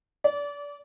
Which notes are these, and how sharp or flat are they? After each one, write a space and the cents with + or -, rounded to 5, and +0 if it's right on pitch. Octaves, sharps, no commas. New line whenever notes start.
D5 -25